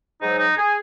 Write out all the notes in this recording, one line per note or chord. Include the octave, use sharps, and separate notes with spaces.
G#2 F#3 D#4
D#4
G#4